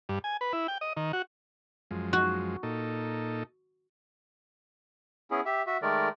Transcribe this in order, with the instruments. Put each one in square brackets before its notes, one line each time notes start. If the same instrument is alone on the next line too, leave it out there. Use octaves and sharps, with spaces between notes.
[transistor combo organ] G2
G#5
B4
E4
G5
D#5
D#3
F#4
F#2 F3 G#3
[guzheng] F#4
[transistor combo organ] A#2 D#4 A4
[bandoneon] B3 C#4 E4 G#4
G4 E5
F#4 E5
D#3 G#3 A3 A#4 D5